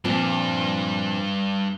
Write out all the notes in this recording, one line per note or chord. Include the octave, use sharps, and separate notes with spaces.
G2 A#2 F3 C4 D4